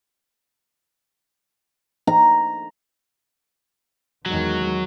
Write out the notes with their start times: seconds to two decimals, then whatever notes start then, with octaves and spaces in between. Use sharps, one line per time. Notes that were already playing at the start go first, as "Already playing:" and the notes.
2.07 A#5
4.26 E2 D#3 F#3 G#3